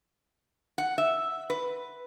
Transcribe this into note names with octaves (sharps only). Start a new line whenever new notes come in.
F#5
E5
B4